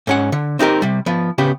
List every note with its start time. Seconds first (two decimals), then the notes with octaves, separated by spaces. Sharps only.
0.07 G#2 C#4 F#5
0.32 D3
0.59 C4 D#4 G4 A#4
0.82 C3 G3
1.06 F3 B3
1.38 C#3 B3 G4